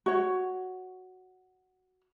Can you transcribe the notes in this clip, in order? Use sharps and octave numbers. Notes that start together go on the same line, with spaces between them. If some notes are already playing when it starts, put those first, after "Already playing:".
F#4 C#5